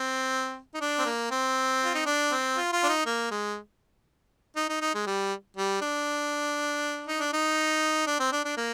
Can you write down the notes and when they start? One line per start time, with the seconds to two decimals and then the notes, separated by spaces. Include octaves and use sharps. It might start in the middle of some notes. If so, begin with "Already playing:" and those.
Already playing: C4
0.74 D#4
0.81 D4
0.99 C4
1.06 A#3
1.31 C4
1.84 F4
1.95 D#4
2.06 D4
2.31 C4
2.57 F4
2.73 F4
2.83 D4
2.89 D#4
3.06 A#3
3.31 G#3
4.56 D#4
4.69 D#4
4.81 D#4
4.94 G#3
5.07 G3
5.57 G3
5.81 D4
7.07 D#4
7.19 D4
7.33 D#4
8.07 D4
8.20 C4
8.32 D4
8.45 D4
8.57 A#3